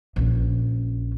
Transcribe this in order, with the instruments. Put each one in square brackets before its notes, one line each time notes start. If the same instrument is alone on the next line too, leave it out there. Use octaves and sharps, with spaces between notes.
[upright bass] A#1 C#4